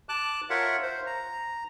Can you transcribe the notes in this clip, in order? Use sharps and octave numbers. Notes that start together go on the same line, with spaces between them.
A5 D6 F#6
F4 A#4 C#5 E5 F#5
C5
A#5